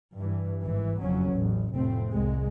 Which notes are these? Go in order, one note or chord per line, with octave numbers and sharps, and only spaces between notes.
G2 E3
G#1 E3
F#1 F2 F#3 C#4
A1 E2
F1 A2 A3 C4
C2 G#3